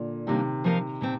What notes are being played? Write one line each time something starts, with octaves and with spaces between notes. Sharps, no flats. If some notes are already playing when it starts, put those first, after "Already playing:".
Already playing: A#2 D3
C3 D#3 G3 A#3 D4
F3 A#3 D#4 A#4 F5
A#2 A3 C4